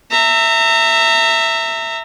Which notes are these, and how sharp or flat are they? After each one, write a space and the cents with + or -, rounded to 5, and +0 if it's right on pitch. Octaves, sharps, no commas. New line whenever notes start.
E5 +0 A#5 -35